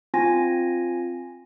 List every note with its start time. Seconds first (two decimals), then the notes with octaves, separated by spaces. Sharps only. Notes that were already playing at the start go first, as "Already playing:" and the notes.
0.14 C4 F4 G#5 A#6